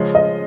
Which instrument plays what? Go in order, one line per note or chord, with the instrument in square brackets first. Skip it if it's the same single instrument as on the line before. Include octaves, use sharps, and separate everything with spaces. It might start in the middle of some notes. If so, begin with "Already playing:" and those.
Already playing: [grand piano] C#3 F3 G#3 C#4
[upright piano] D#5